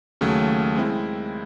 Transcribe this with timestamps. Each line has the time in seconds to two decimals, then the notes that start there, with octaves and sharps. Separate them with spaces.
0.21 D#2 C#3 F#3 A3
0.76 G#3 C4 E4